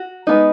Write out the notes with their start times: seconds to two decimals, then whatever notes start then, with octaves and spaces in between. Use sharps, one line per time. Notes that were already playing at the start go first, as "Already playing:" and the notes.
Already playing: F#4
0.27 G#3 B3 D#4